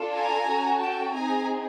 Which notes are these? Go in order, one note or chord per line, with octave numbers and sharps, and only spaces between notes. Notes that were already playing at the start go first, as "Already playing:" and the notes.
Already playing: D4 F4 A4
G#5 A#5
C#4 F#4 A4
G5 A5
C4 D#4 G#4 G#5 A#5